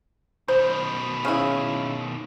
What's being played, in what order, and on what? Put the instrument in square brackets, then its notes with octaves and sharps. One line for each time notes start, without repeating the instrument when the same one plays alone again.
[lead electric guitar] B2 D#3 [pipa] C5
[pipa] C#3 E4